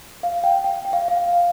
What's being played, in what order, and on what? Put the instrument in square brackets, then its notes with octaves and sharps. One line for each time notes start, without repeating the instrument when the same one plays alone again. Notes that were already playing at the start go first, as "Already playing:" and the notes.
[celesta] F5
G5
G5
G5
F5
F5